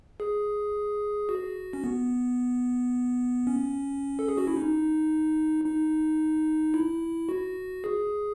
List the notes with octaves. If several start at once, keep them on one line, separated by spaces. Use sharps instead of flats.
G#4
F#4
C#4
B3
C#4
A4
G#4
F#4
E4
D#4
D#4
E4
F#4
G#4